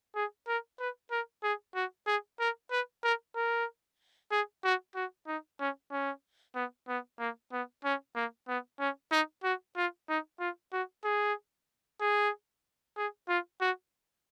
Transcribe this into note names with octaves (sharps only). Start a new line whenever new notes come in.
G#4
A#4
B4
A#4
G#4
F#4
G#4
A#4
B4
A#4
A#4
G#4
F#4
F#4
D#4
C#4
C#4
B3
B3
A#3
B3
C#4
A#3
B3
C#4
D#4
F#4
F4
D#4
F4
F#4
G#4
G#4
G#4
F4
F#4